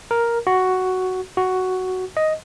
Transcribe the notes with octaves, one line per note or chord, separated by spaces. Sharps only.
A#4
F#4
F#4
D#5